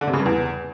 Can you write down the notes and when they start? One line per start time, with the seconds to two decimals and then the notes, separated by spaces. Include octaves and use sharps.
0.01 D3
0.07 C3
0.13 C#3
0.19 G2
0.26 E2